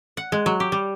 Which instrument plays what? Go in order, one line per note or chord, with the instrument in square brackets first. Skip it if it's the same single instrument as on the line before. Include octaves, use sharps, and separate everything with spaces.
[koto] F#5
G#3
F#3
G4
G3